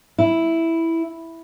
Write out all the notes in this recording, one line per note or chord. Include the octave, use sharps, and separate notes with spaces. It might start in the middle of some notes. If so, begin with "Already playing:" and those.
E4